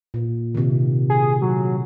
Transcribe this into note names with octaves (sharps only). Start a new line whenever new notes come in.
A#2
C3 D#3
G#4
F#3